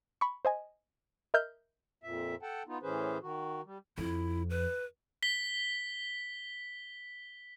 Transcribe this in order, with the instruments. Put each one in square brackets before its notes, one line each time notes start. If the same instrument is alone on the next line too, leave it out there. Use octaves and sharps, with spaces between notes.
[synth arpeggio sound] B5 C#6
C5 D#5 G#5
A#4 D#5 E5 F6 G6
[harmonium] F2 A#2 E5
A4 F#5 G5 A5
B3 D#4 F4
A2 E3 C#4 G#4 B4 C5
D#3 F#4
G3
[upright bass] F2 [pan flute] E4
[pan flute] B4
[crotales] B6 G7